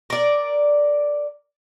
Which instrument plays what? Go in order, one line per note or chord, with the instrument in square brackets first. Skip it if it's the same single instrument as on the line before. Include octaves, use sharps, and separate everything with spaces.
[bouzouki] A#4 D5